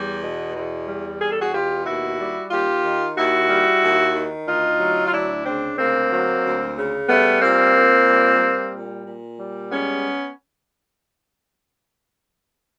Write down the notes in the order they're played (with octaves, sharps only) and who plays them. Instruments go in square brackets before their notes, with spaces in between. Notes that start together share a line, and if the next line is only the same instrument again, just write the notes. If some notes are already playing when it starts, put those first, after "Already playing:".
Already playing: [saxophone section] E2 G3
B2
E2
G3
E2 G#4
A4
F#4 G#4
B2 F4 G4
D#2 E4 F#4
G3
D#2 F4 G4
D#3
D#2 E4 F#4
G3
D#2
D#3
D2 D#4 F4
F#3
F4
D2 D4 E4
C#3 C4 D4
D2 A#3 C4
F#3
D2
C#3
G3 A3 B3
A#2 A#3 C4
A#2
G3
G3
A#2
A#2
G3
G#3 B3 C#4